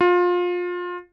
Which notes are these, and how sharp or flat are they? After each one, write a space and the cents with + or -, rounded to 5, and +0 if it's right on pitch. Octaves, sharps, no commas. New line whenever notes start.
F4 +25